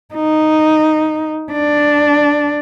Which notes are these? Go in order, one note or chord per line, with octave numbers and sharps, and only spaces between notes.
D#4
D4